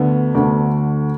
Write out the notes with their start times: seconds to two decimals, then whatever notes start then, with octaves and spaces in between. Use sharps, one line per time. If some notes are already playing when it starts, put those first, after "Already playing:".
Already playing: D2 D3 B3
0.35 D2 D3